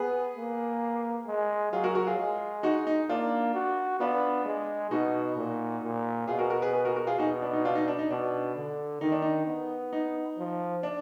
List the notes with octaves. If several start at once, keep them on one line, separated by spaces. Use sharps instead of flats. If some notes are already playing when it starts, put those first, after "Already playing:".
Already playing: B3 G#4 B4
A#3
G#3
F#3 F4 G#4
F#4 A#4
F#4 A#4
F4 G#4
G#3
D#4 F#4
D#4
A#3 D4 F4
F#4
B3 D4 F4
G#3
B2 D#4 F#4
A#2
A#2
B2 F4 G#4
F#4 A#4
F#4 A#4
G#4 B4
G#4 B4
F#4 A#4
F#4 A#4
F4 G#4
B2 D#4 F#4
D4
D#4
D4 F4
D#4
D4
D#4
B2 D4
D3
D#3 D#4
D4
D#4
B3
D#4
F3
D4